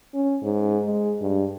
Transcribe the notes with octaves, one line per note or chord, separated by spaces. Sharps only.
C#4
G#2
G#3
G2